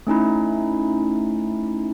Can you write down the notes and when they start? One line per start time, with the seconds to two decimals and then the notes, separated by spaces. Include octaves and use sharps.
0.07 A3 C#4 D#4 E4